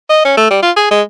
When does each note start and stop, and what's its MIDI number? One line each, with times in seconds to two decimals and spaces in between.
0.10 0.23 75
0.25 0.32 61
0.37 0.49 57
0.50 0.62 55
0.63 0.71 65
0.77 0.89 68
0.91 1.02 56